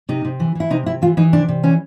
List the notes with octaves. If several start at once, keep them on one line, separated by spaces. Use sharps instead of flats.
C3 D#4
C3
E3
E3 E4
C3 D#4
C3 E4
E3 F4
E3 D#4
C3 D4
C3
E3 C#4